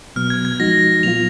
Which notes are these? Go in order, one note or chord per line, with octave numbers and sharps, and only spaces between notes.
B2 F#3 B3 F6
G#6
G#6
F3 G#3 D#4 F#4 A#6
A#2 F#3 B3 F4 F7